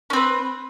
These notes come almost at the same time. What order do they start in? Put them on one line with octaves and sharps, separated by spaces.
C#4 C4 B4